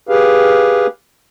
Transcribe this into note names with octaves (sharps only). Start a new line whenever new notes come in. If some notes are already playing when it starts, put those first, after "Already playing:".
G4 G#4 B4 F5